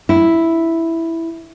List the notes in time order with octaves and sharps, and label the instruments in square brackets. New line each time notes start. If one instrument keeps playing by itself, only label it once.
[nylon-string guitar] E4